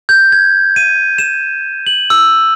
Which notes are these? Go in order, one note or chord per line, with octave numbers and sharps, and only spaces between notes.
G6
G#6
D#7
E7
F#7
E6